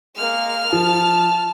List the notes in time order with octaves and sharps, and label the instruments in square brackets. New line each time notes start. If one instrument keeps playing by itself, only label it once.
[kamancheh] G#3 A#3 [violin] F6
[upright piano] F3 [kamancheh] A5